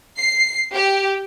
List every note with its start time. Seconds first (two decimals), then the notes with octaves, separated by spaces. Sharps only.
0.18 C7
0.74 G4